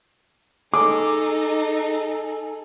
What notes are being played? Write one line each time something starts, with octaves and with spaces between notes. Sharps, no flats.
D#4 G#4 A4 D6